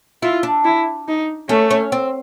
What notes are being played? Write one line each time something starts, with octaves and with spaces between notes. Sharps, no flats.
E4 F4
D4
E4
D#4
A3 C#4
C#4
C4